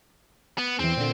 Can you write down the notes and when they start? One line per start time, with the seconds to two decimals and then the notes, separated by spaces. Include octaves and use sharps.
0.58 B3
0.79 E2 E3 C4
0.97 A#2 D3